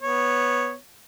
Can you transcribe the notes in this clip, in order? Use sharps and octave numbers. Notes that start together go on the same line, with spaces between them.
B3 C#5